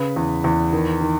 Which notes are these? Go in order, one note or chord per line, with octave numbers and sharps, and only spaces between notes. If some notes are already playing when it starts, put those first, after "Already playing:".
Already playing: C#3 B4
E2
E2
D#3
D#3